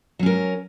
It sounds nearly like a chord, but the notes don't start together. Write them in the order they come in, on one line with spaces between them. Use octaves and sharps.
F#3 C#4 A#4